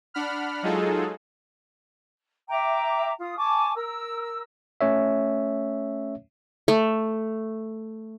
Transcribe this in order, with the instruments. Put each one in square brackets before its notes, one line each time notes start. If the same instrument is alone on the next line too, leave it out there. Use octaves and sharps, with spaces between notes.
[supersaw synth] D4 F#5 B5 F6
F#3 G#3 D#4 F4 G#4 A4
[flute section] E5 G5 A#5 D6
F4 D#6
G#5 A5 C#6 D6
A#4 E6
[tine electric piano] A3 C#4 C#5 E5
[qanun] A3